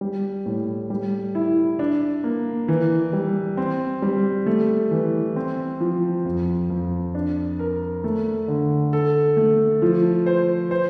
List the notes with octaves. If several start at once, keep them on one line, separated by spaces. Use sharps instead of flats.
G3
A2
G3
E4
D4
A#3
E3
G3
C4
G3
A3
E3
C4
F3
F2
F2
D4
A#4
A3
D3
A4
A3
F3
C5
C5